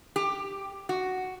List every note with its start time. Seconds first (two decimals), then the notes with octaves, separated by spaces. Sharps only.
0.16 G4
0.89 F#4